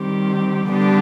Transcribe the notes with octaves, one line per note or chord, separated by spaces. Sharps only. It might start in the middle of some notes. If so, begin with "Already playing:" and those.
Already playing: D#3 G3 C4 G4
D3 G3 B3 D4 G4